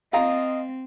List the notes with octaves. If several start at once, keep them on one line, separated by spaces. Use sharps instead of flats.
C4 F4 D#5 F5 A#5